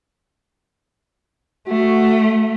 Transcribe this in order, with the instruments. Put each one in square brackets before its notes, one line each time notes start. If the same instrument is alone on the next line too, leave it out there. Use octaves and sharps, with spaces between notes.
[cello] A3 [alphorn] F#4